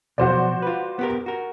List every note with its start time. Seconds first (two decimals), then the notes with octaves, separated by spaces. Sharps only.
0.18 B2 F3 F#3 F#4 C5 D5
0.62 F4 B4
0.99 B3 G4 A#4
1.26 F#4 A#4